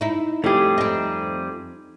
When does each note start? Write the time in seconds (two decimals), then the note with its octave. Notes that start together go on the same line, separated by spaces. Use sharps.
0.01 D#4 E4
0.44 F2 G3 A3 G4 G#4
0.78 C4 D#4